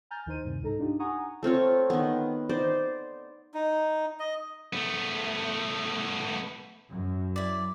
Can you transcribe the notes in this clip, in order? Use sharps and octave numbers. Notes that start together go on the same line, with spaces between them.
G#5 A#5 F6 G6 A6
D#2 D#3 D#4 C5 D#7
G2 C3
C#2 G#2 D#4 A4 A#5
D4 D#4 F4 G4
F#5 G#5 A#5 C#6 D#6
A3 C4 F4 C#5
D#3 B3
D#4 C5 D5
D#4
D#5
A3 B3
F#2
E4 D5